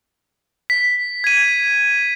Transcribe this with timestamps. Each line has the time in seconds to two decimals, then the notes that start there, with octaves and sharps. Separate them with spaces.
0.70 B6
1.24 G#6 D#7